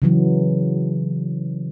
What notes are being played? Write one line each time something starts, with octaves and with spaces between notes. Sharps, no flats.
C#3 E3 F#3